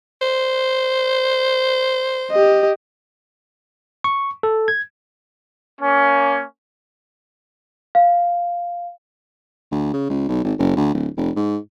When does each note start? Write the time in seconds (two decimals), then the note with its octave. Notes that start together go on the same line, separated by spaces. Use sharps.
0.22 C5
2.31 G4 D#5
4.04 C#6
4.43 A4
4.68 G#6
5.81 A#3 C#4
7.95 F5
9.72 D2
9.93 C#3
10.10 C#2
10.29 B1
10.44 G#1
10.59 F#1
10.77 D2
10.94 D1
11.17 F1
11.36 G#2